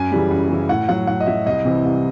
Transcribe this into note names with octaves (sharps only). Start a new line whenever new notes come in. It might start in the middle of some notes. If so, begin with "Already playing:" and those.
Already playing: F#2 G#5
C#3 E3 G3
F#2
C#3 E3 G3
A2 F#5
F#3 F#5
A2 F#5
D#5
F#3 E5
C2 D#5
C3 E3 G3
C2